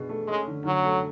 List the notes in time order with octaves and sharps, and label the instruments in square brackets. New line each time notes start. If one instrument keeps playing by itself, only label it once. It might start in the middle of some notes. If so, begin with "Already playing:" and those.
Already playing: [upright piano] B2 D4 G#4
A3
[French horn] G#3 [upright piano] C#4
[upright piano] D3
[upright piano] D3 [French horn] F#3
[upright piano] A3